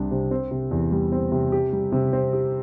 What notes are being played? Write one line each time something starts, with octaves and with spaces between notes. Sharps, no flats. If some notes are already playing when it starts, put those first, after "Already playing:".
Already playing: C2 C3 G3 D4
C3
C4
C3
E2
G3
C4
C3
G4
G3
C3
C4
G4